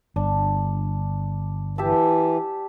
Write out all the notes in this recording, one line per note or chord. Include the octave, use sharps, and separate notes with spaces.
G1 D4
E3 G4 E5 A5